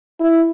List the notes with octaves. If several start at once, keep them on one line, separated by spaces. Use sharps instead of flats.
E4